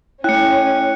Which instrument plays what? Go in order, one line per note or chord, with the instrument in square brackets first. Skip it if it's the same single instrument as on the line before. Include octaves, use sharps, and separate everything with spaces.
[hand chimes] A3 G5 [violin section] C#4 [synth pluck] E4 [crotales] F#6 C#7